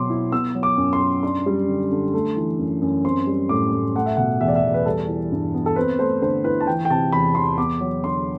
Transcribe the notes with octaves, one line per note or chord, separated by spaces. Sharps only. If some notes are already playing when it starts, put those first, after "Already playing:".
Already playing: B2 F#3 C4 C6 D6
E4
B3 E6
F#3
D6
F#2
C6
F#2
D4 C6
G3
D3
D3
A3
E3
F#2
F#2
C4 C6
G3
A2 D6
A2
A3 F#5
E5
B2 F#5
E2 E5
D5
E5
E2
B4
G3 A4
E3
G2
B3
A4
C4 B4
A3 C5
D3 C5
E4 B4
A5
E3 G5
G5
C3 A5
E2 B5
E2 C6
B3 D6
F#3
D3 C6